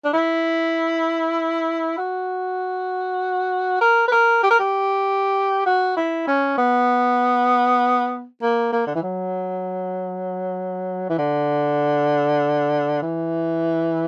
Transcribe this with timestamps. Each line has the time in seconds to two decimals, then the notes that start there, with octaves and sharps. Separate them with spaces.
0.05 D4
0.13 E4
1.98 F#4
3.81 A#4
4.08 B4
4.12 A#4
4.43 G4
4.51 A#4
4.59 G4
5.66 F#4
5.97 E4
6.27 C#4
6.58 B3
8.42 A#3
8.73 A#3
8.87 D3
8.95 E3
9.03 F#3
11.10 E3
11.18 D3
13.02 E3